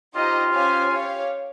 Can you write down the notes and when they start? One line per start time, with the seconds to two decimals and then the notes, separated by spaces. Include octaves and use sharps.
0.14 D#4 F4 G4 C5 D#5
0.53 C#4 G4 C5 F5 G#5
0.92 G4 C#5 F5